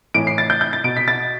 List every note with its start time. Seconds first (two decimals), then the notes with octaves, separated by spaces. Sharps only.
0.14 A2 E3 D7
0.27 C7
0.38 A6
0.50 G6
0.61 G6
0.73 A6
0.84 B2 D7
0.97 B6
1.08 A6